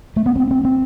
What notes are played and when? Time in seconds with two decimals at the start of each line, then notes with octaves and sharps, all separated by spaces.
0.16 A3
0.26 B3
0.36 C4
0.51 C4
0.65 C4